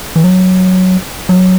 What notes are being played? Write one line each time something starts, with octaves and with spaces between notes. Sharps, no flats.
E3
F#3
F#3